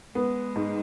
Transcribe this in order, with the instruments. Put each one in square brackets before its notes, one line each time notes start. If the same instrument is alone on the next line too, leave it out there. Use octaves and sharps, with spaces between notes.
[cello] G#3 [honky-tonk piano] B3
[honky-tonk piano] G#2